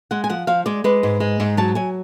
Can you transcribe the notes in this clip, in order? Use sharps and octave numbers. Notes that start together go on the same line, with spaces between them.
G#3 F#5
G#5
F3 F#5
F3 F5
G#3 D5
G#3 B4
G#2
G#3
G#2
F#3 A5
F#3 G#5